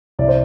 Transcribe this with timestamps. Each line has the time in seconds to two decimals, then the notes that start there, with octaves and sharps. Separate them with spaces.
0.19 C2 D5
0.28 C5